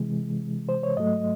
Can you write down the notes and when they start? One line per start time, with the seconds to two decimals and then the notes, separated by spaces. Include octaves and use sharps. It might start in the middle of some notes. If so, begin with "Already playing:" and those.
Already playing: C3 E3 G#3
0.69 C5
0.83 C#5
0.97 G#2 F#3 A3 D#5